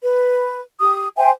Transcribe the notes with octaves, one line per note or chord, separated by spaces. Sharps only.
B4
G4 D#6
C5 E5 G5 G#5